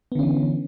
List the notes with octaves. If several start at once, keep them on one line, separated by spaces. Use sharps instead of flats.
D3 E3 B3 C#4